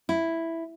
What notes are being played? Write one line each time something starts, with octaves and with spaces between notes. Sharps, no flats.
E4